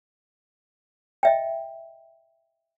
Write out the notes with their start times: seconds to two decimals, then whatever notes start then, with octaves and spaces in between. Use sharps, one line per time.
1.23 D#5 E5 G5